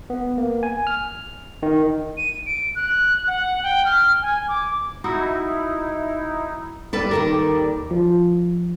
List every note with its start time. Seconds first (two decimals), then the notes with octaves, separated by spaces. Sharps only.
0.10 B3
0.38 A#3
0.63 G#5
0.87 F6
1.63 D#3
2.17 D#7
2.46 D7
2.75 F#6
3.27 F#5
3.63 G5
3.85 F6
4.22 G#5
4.48 D6
5.04 D#4 E4 F#4
6.93 D#2 G3 A4 B4 D5
7.11 D#3 A4 A#4
7.91 F3